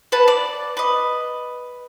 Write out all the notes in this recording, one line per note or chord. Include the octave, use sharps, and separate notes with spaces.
B4 F#5 A5
D5
B4 D#5